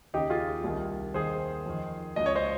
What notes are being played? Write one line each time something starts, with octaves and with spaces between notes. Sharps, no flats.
D#2 C#3 D#4 G4
F4 G#4
C2 C3 D#3
D#2 D#3 G#4 C5
F2 D#3
C#2 C#3 D#5
C#5
C5 D#5